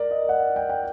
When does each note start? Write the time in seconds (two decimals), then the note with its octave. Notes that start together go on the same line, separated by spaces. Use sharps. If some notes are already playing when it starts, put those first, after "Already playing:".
Already playing: A#4 D5
0.11 D#5
0.29 F#5
0.56 G5
0.69 G5